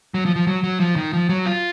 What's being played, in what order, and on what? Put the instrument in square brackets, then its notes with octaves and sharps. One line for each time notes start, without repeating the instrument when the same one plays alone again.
[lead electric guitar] F#3
F3
F3
F#3
F#3
F3
D#3
F3
F#3
F4